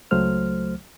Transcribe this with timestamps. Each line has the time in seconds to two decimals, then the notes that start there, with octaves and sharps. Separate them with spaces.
0.11 C#2 F#3 A3 C5 F6